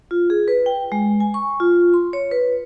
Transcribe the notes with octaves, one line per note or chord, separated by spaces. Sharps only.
F4
G#4
B4
G5
G#3
G#5
C#6
F4
C6
C#5
B4